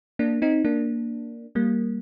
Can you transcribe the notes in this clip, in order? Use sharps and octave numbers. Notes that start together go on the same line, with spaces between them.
A#3 D4
C4 D#4
A#3 D4
G3 A#3